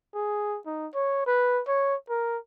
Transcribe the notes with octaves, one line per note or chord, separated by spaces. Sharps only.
G#4
D#4
C#5
B4
C#5
A#4